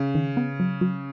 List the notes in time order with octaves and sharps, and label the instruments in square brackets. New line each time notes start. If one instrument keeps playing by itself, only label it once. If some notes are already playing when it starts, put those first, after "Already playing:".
Already playing: [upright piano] C#3
[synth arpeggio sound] D#3
B3
F#3
F#3